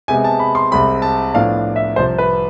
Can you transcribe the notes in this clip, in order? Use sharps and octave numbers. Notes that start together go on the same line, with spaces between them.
C3 G#3 B3 G#5
A5
B5
C6
C2 C3 G#3 C4 B5
A5
A2 F3 B3 D4 F5
E5
C2 C3 F3 C5
B4